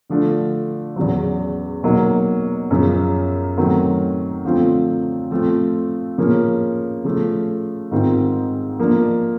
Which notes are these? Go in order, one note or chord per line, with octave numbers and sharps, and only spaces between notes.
D3 F3 A3 D4
E2 C#3 F#3
B2 F#3 A#3 D#4
F#2 C#3 F3
D#3 F#3 A3 C4
D3 F3 A3 C4 F4
F3 A3 C4 F4
C#3 F3 A#3 C#4
C#3 F3 A3
G#2 D#3 G#3 C4 F4
F3 A#3 D4